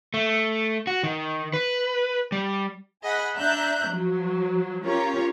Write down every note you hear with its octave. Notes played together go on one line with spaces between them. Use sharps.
A3
F#4
D#3
B4
G3
G#4 D#5 F#5 B5
D4 E5 A#5 F#6 G6
F3 F#3
C#4 F4 G4 A#4 C#5 A#5